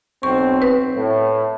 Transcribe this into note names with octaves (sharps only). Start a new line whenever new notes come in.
B1 C4 C#6
B4
A2